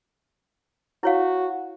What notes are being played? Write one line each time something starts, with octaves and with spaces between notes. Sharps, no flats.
E4 F#4 C#5 F5